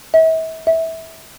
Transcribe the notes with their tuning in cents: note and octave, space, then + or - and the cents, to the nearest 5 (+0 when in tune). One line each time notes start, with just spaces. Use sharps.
E5 -40
E5 -20